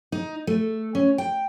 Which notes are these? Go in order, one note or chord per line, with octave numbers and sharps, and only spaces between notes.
D#4
A3
C#4
G5